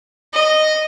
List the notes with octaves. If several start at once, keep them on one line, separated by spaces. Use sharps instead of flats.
D#5